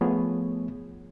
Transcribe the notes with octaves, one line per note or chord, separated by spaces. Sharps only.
F3 A3 B3 G#4 C#5